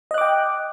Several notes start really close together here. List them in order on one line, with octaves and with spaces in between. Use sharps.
D#5 F#6 D6 G5